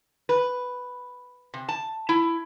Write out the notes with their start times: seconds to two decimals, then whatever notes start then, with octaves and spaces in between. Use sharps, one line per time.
0.29 B4
1.54 C3
1.69 A5
2.09 E4